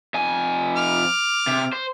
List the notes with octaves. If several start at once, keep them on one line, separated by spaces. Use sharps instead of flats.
F2 G#5
D6 F6
C3
C5